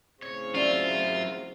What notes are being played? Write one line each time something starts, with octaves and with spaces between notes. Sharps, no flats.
A2 C#3 C4 C#5
F#3 C#4 F4 D5 E5